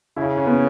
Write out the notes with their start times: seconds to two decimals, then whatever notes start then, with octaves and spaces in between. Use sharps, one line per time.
0.16 C#3 E4
0.37 C#4
0.47 B3